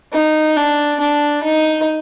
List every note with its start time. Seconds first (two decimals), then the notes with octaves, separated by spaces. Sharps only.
0.13 D#4
0.56 D4
1.00 D4
1.43 D#4